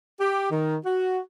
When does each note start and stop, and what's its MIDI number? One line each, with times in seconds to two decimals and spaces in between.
0.20 0.49 67
0.51 0.76 51
0.86 1.18 66